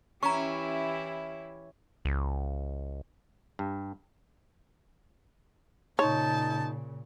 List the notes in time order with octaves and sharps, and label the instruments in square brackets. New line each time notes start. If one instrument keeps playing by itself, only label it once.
[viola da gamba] E3 E4 G4 [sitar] C#4 [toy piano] A#5 C#6
[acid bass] C#2
[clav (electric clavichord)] G2
[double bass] A#2 C#3 [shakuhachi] D#4 [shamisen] C#5 [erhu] A5